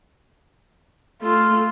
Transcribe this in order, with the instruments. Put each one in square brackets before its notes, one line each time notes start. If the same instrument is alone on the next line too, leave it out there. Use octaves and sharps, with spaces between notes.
[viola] A3 [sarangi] F4